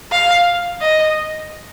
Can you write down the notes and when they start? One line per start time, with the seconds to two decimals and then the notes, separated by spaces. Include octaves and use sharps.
0.12 F5
0.81 D#5